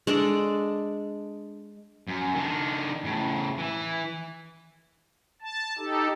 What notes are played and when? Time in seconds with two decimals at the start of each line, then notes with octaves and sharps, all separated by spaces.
0.07 G#3 D4 A4 D5
2.08 F#2
2.34 D#3 D4
3.04 A2 C#3
3.58 E3
5.41 A5
5.78 D#4 G4 A4